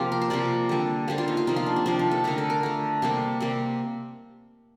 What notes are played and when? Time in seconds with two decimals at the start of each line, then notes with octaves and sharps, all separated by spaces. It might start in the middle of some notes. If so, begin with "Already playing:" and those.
Already playing: C3 F3 A#3 F4 G4
0.12 A#4
0.22 C5
0.30 C3 F3 A#3 D5
0.69 D3 G3 A#3
1.08 D3 G3 A#3 C5
1.18 F4
1.28 D#4
1.37 F4
1.47 C3 F3 A#3 D#4
1.56 F4
1.66 D4
1.76 C4
1.86 C3 F3 A#3 D4
1.99 D#4
2.11 A4
2.24 D3 A3 A#4
2.38 A4
2.50 A#4
2.63 D3 A3
3.02 C3 G3 A#3 G4
3.40 C3 G3 A#3